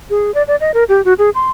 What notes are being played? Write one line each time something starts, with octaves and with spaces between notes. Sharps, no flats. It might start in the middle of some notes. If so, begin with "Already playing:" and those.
G#4
D5
D5
D#5
A#4
G4
F#4
G#4
C6